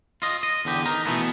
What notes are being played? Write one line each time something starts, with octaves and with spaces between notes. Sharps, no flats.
F4 D#5
D#5
E2 D3 G4
D#4 A#4
B2 E3 A3 B3